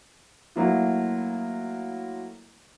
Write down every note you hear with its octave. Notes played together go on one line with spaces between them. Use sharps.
F#3 A3 A#3 E4 F4